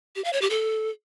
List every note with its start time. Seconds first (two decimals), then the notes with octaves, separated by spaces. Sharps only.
0.16 G4
0.24 F5
0.33 C#5
0.42 G4
0.50 A4